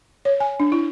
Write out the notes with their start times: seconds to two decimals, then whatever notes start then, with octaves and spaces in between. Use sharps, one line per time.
0.25 C#5
0.40 G#5
0.60 D4
0.72 E4